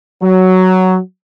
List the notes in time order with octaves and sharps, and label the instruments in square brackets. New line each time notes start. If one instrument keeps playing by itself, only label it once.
[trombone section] F#3